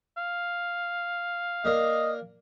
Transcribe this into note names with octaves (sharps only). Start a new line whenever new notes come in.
F5
A#3 D4 A#4 D#5